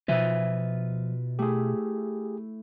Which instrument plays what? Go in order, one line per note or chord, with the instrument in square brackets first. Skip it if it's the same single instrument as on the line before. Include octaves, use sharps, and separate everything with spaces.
[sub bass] B2 [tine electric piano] F3 [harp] D#4 E6 [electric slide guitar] F4 B4 E5
[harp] A3 E4 [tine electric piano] G4 G#4